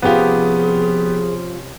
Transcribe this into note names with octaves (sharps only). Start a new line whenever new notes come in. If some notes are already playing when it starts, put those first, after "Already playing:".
C3 F3 B3 C#4 F4 G4 G#4